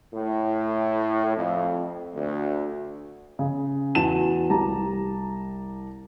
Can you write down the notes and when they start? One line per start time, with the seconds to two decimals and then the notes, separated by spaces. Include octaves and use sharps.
0.14 A2
1.36 F2
2.15 D2
3.39 C#3
3.95 E2 F#4 A5 E7
4.50 C2 G4 A5 A#5